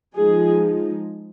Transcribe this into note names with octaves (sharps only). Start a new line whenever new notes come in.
F3 G#3 D#4 G#4